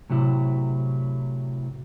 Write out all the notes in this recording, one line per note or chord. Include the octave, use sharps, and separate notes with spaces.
A2 C3 F#3 E4